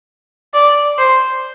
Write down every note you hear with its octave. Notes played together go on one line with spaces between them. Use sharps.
D5
C5